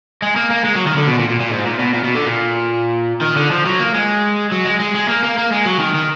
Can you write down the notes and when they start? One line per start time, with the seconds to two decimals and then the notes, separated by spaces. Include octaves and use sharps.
0.22 G#3
0.36 A#3
0.50 A#3
0.64 G#3
0.75 F#3
0.87 D#3
0.96 D3
1.07 B2
1.19 A#2
1.29 A#2
1.40 A#2
1.50 G#2
1.65 A#2
1.79 B2
1.94 A#2
2.04 B2
2.15 D3
2.25 A#2
3.22 D#3
3.37 D3
3.51 F3
3.65 F#3
3.79 A#3
3.94 G#3
4.52 F#3
4.65 G#3
4.80 G#3
4.94 G#3
5.08 A#3
5.23 A#3
5.37 A#3
5.52 G#3
5.66 F#3
5.80 D#3
5.94 D#3